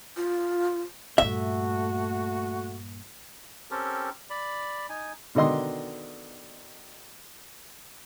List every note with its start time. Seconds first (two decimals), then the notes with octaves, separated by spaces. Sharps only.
0.17 F4
1.18 G2 A#2 A3 F#4 E5
3.71 C4 C#4 G4 A4 A#4
4.30 D5 B5
4.89 D#4 G#5
5.35 B2 D3 D#3 D#5 C6